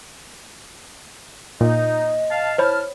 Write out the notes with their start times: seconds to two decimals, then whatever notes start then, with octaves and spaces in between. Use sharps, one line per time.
1.61 A#2 D#4 D#5
2.31 F5 A5
2.58 E4 C5 C#5 A5 B5 F6